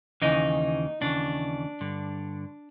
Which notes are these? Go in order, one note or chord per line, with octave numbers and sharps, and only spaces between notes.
D#2 C#3 E3 D#4
D#2 C#3 E3 D4
G2 D3